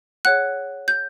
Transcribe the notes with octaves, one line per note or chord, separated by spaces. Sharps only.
G#4 C#5 F#5 F#6
G6